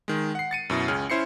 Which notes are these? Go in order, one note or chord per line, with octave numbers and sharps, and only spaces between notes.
D#3 G#3
F#5 C7
A6 C#7 D#7
F#2 B2 E4 A#6
C#2 C#4 G#4 F6
C#4 E4 C5 C7 C#7